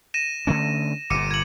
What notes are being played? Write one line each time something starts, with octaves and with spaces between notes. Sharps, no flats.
A#6 D#7 E7
D3 A3 C#4
G1 A#2 D6 C#7 D#7
G#6 F#7